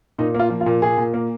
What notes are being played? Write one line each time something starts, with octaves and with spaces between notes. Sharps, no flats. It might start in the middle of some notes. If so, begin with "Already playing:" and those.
A#2 D#4
A#3
F4
F3
F4
A#2
A#2 G#4
A#2
A#3